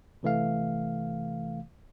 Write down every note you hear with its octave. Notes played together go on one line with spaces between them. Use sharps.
C3 E3 A3 F5